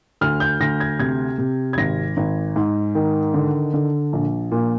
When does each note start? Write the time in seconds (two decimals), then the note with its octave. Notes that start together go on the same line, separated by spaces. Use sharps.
0.21 D2 F6
0.40 G6
0.60 D2 A#6
0.80 G#6
0.99 C3 G#6
1.38 C3
1.73 G#6
1.78 G#1 A#6
2.17 G#1
2.56 G#2
2.95 D#3
3.34 D3
3.74 D3
4.13 A#1
4.51 A#2